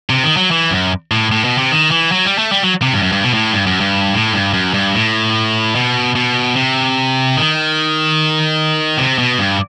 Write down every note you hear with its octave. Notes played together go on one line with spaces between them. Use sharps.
C3
D#3
F#3
E3
F#2
A2
A2
B2
C3
D#3
E3
F#3
G3
A3
G3
F#3
C3
G2
F#2
G2
B2
A2
G2
F#2
G2
A2
G2
F#2
G2
A2
B2
B2
C3
D#3
C3
B2
G2